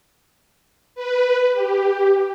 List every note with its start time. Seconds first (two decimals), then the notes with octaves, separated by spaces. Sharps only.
0.95 B4
1.53 G4